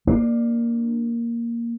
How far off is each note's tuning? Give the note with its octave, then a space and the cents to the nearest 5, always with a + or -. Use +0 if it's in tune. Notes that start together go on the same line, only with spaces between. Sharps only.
A#3 +0 D4 +20